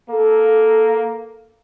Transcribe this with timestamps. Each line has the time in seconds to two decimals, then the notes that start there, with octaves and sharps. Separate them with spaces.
0.10 A#3 A4